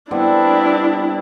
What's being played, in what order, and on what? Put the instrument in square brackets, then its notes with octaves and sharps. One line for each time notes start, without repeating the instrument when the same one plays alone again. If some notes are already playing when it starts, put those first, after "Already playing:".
[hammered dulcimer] G3 B3 C4 [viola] D4 E4